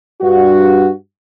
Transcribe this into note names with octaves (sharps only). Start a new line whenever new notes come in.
G2 F#4